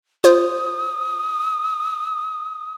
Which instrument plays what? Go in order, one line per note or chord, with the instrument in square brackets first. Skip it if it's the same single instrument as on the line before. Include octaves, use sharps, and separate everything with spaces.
[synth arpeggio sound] F4 C5 [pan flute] D#6